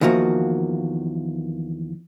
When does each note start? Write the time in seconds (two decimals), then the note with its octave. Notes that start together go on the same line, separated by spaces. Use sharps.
0.01 E2 D#3 F3 A#3 F#4